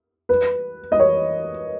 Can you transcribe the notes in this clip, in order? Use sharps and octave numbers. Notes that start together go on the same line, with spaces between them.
B4
D#5
C#5